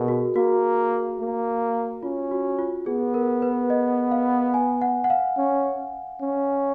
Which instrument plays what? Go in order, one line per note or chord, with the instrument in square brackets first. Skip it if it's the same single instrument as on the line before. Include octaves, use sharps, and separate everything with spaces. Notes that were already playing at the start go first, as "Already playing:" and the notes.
Already playing: [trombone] B2 [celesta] G#4 A#4
[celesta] F#4
[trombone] A#3 [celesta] F#4
[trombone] A#3
[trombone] C#4 [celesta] F4
[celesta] F#4
F4
[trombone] B3 [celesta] G#4
[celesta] A#4
B4
D#5
F5
G#5
F#5
F#5
F5
[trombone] C#4
C#4